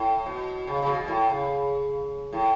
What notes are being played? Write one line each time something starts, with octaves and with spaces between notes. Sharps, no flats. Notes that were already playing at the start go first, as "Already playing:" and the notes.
Already playing: A2
B2
C#3
C#3
B2
B2
A2
C#3
A2